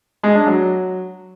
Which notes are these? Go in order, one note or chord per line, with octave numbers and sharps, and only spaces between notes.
G#3
D4
F#3